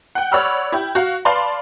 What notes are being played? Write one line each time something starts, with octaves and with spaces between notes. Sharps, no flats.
F#5 G5
C#5 D5 F#5 B5 E6 F6
E4 G4
F#4 F5
B4 D5 F5 A5 B5 C6